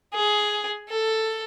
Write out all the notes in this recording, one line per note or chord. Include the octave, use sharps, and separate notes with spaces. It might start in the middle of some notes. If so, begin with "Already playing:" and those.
G#4
A4